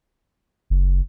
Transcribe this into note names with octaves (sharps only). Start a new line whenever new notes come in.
F#1